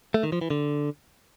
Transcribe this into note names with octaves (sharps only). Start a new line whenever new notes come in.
A3
D#3
F3
E3
D3